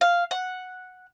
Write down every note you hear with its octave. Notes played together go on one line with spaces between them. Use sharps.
F5
F#5